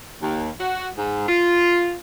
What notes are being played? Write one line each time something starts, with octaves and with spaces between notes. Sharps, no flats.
D#2
F#4
G#2
F4